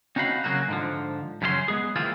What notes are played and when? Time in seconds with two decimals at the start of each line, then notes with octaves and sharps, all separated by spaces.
0.16 C4 C#4 D#4 F#4 F5 B5
0.44 C#3 F#3 A#3 F#4
0.68 G#2 D3 F3
1.42 F#2 C#3 C#4 G4 C6
1.68 G#3 B3 G#4
1.96 E3 G#3 A#3 C4 E4 F4